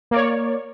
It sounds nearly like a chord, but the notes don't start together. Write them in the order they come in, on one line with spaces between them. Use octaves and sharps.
A#3 D5 C#5